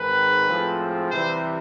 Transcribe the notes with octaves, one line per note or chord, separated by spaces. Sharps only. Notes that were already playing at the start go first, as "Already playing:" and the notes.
Already playing: G#2 D#3 G#3 C4 B4
A2 F3 G#3 C4
C3 E3 G3 C5